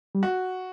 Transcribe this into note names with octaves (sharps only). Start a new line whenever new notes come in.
G3
F#4